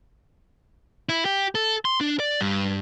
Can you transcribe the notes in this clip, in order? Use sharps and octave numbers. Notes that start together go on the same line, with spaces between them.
E4
G4
A4
C6
D4
D5
G2